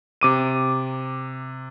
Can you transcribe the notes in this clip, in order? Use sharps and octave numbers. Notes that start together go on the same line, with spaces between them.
C3 D6 D#7